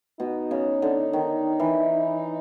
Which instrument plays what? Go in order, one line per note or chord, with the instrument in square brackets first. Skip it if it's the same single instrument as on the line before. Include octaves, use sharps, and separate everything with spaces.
[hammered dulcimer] B2 [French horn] D#4
[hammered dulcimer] C#3
D3
D#3
E3